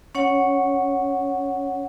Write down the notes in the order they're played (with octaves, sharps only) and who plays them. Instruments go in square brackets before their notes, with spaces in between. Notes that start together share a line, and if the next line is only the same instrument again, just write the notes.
[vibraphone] C#4 C#5 F#5